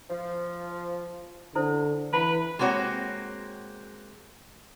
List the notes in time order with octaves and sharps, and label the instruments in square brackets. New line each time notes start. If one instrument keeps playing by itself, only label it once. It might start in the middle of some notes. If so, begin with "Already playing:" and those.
[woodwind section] F3
[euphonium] D3 [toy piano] E4 A4 C5
[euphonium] E3 [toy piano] E4 F#5 B5 [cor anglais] B4
[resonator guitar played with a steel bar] G#3 A#3 C4 F#4 C#5